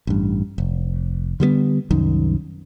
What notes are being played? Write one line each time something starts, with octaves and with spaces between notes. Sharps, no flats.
A1 G2
F1
D3 G3 G#3 B3
C2 F#2 D#3